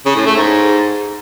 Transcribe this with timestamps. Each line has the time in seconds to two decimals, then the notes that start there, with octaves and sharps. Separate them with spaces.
0.06 C#3
0.16 A2
0.26 A3
0.36 G#2